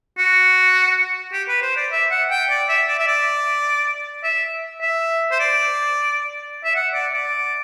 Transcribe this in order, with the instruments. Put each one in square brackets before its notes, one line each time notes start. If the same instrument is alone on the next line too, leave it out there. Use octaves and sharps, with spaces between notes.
[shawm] F#4
G4
B4
C5
D5
E5
F#5
G5
D5
E5
D5
E5
D5
E5
E5
C5
D5
E5
F#5
D5
D5